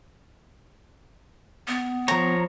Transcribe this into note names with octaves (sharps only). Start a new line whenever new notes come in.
B3
F3 C#5 A#5